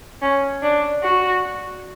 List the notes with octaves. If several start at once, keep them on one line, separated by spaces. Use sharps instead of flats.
C#4
D4
F#4